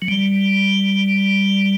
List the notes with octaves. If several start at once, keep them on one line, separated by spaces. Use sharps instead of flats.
F#3
G3